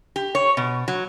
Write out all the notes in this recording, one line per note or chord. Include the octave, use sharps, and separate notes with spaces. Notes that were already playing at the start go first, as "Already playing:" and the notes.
G4
C#5
B2
F#3